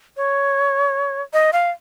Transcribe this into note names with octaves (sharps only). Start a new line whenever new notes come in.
C#5
D#5
F5